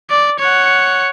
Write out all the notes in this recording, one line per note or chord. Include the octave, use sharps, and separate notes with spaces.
D5
C#5 F#5